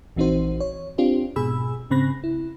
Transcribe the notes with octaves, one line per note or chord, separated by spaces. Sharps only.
A#1 E3 C4 D#4 F#4 C5
C#5
C4 D4 F4 G4 C5
G#2 B2 G#4 G#5 B5 E6
G#2 C#3 C4 B5 F#6 A#6
E4